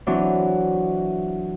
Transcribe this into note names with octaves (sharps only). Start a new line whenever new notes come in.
E3 F#3 C4 D4